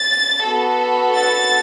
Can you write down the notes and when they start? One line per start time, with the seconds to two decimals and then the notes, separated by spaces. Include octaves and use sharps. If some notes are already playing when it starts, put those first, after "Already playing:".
Already playing: A6
0.45 B3 F#4 A4
1.17 A6